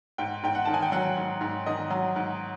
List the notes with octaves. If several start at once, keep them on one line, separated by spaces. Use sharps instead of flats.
G#2 G5
G#2 G5
F#5
D#3 A5
G#5
G5
F#3 F#5
G#2
G#2
D#3 D#5
F#3
G#2